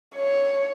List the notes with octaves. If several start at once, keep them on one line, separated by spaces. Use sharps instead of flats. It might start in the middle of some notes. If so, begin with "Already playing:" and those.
C#5